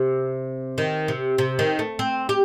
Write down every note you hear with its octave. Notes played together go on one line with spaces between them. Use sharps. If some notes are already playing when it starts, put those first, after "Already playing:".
Already playing: C3
D#3
C3
C3
D#3
A3
C4
G4